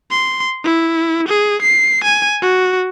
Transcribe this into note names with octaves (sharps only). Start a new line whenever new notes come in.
C6
E4
G#4
C7
G#5
F#4